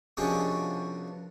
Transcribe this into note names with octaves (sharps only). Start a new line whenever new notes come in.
C2 B2 F3 C#4 D4 G#4